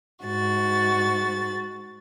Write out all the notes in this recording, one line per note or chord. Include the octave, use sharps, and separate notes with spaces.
G#2 F#4 A6